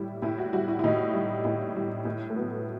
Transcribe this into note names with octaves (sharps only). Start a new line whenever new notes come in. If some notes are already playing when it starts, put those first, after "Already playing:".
Already playing: A2 G3 E4
A2 E4
F#4
G3 F#4
E4
E4
A2 D#4
G3
A2 E4
G3
A2
A3
F#3 B3